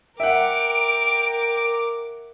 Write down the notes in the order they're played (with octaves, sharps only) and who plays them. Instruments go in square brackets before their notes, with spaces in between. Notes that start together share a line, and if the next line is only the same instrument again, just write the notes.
[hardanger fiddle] A#4 D6 [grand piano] E5 F#5 [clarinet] G5 [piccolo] D7